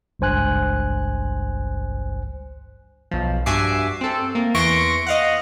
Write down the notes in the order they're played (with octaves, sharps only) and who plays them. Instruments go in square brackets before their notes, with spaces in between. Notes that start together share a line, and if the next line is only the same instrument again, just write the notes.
[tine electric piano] G#1 C#2 G2 C5 G#5 F#6
[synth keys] B1 F3
G2 F#4 E5 G#5 D6 C7
C4 A4
A#3
E2 E3 C6 C#6 A#6 D7
D#5 F5 F#5